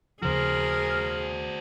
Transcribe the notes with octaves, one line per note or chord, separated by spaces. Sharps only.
D#2 C#3 F3 F#4 G#4 A#4 C5